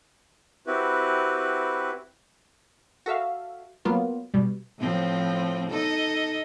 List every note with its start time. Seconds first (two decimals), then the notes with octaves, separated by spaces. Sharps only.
0.67 C4 E4 F#4 G4 B4
3.06 F#4 A4 E5 F5
3.85 F#3 A#3 B3 F4
4.34 B2 G3
4.80 A2 F3 C4
5.70 D#4 A4 D#5